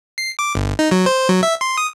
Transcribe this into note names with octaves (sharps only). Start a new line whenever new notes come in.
C7
D6
G1
D#4
F#3
C5
F#3
E5
C6
D#6